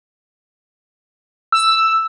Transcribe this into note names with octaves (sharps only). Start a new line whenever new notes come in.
E6